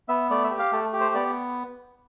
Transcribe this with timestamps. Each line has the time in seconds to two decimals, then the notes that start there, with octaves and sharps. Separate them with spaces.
0.09 B3 E5
0.30 A3 D5
0.44 E5
0.51 G4
0.59 F5
0.72 A3 A4
0.93 G4
1.00 C5
1.15 B3 D5